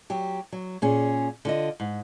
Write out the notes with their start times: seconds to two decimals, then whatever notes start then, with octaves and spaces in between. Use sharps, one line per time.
0.10 F#3 G4
0.52 F#3
0.82 A#2 C#4 G#4
1.45 D3 F4 D#5
1.80 G#2